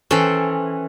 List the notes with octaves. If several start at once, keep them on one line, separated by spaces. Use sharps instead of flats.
E3 C#4 A4 C5 G5